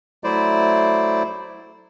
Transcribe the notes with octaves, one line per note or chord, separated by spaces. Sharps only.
F#3 A3 E4 C5 D5